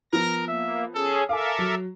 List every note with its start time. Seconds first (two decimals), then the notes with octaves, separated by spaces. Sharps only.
0.13 F3 B3 A#4 A#6
0.48 A#3 E5
0.95 C#4 G#4 A4
1.29 A4 A#4 E5 F5 G#5 D6
1.58 F#3